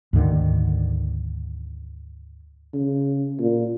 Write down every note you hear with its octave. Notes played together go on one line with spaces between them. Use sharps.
D2 G#2 D3 D#3
C#3
A#2